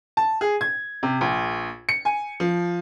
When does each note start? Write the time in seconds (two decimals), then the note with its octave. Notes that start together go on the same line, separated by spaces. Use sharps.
0.17 A5
0.41 G#4
0.61 G#6
1.03 C3
1.21 A#1
1.89 C#7
2.05 G#5
2.40 F3